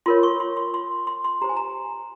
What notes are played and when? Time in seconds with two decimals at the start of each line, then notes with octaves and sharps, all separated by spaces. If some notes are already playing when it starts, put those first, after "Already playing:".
0.06 F4 A#4 C#5 C6
0.23 C#6
0.40 C6
0.57 C6
0.74 C6
1.07 C6
1.24 C6
1.42 G4 C5 A#5
1.49 G#5
1.57 A#5